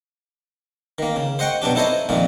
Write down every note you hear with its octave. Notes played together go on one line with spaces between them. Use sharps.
D#3 A#3
C#3
C5 D#5 F#5 G5 C#6
B2 F#3 D4 G4
D#4 E4 A4 C5 C#5 D#5
F2 A#2 D#3 G#3